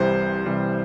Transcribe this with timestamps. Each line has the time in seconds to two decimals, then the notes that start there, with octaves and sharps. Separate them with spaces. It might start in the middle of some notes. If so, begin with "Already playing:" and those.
Already playing: C2 C3 E3 G3 C5
0.46 C2 C3 E3 G3